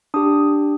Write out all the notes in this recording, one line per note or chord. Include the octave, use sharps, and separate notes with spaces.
D4 G4 D#6